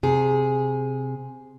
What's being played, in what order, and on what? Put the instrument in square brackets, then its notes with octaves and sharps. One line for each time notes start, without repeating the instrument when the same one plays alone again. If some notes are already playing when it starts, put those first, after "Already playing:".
[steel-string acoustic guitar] C3 G#4